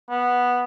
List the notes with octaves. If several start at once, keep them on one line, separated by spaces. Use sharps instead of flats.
B3